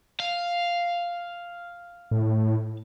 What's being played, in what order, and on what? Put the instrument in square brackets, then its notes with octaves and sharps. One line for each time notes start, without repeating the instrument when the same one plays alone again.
[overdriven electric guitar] F5
[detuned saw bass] A2